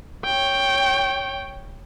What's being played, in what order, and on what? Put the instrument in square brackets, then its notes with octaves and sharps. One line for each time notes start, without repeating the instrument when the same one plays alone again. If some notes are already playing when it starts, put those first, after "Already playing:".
[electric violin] C#5 G5